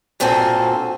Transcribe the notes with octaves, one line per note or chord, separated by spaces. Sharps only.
G2 A#2 C4 F#4 A4 G#5